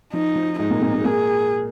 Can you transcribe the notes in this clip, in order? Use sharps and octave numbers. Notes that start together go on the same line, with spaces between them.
F3 D#4
F3
G#2 G#3 D#4
A#2 A#3
A#2 A#3
A#2 A#3
G#3
A#2 A#3 G#4